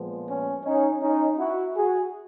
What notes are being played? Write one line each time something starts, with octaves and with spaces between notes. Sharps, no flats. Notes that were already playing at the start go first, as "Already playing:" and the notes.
Already playing: A#2 F3 G#3 B3
C#4
C#4 D#4
C#4 D#4
E4 F#4
F#4 G#4